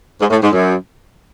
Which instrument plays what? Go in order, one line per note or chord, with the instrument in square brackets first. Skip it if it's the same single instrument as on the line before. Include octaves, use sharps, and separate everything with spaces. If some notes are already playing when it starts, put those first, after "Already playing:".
[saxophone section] G#2
A2
G#2
F#2